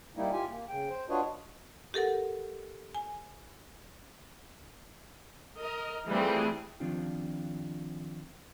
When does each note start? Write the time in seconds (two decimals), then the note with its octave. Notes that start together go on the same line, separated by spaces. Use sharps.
0.17 G3 A#3 D#4 E4
0.32 F4 G4 G#5
0.50 A#3
0.69 C#3 G5
0.89 C5
1.09 D4 F4 F#4 B4 C#5 D#5
1.94 G4 A4 A#4 F#5
2.95 G#5
5.59 A#4 D#5
6.08 E3 F3 G3 A3 C4 G#4
6.80 D#3 F3 C4 D4 F4 G4